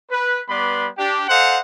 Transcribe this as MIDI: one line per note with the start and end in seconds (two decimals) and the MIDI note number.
0.10 0.42 71
0.49 0.89 55
0.49 0.89 59
0.49 0.89 71
0.49 0.89 74
0.49 0.89 83
0.49 0.89 84
0.98 1.23 62
0.98 1.23 67
1.29 1.60 69
1.29 1.60 72
1.29 1.60 75
1.29 1.60 77
1.29 1.60 78